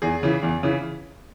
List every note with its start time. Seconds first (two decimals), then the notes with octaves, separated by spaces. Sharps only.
0.02 E2 G#4
0.23 C#3 E3
0.43 E2
0.63 C#3 E3